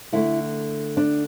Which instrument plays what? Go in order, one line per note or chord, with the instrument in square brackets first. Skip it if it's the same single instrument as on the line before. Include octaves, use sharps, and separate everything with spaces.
[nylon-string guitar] D3 A3 E4
D4